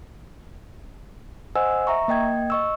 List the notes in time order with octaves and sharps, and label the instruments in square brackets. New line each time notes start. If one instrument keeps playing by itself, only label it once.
[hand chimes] C5 D#5 F#5 G#5 E6
E5 A#5 C#6
A#3 D#5 G5 G#6
D#5 C#6 E6